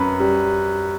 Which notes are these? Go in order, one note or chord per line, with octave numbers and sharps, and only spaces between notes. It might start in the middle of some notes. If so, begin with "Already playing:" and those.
Already playing: F#2 B4
G3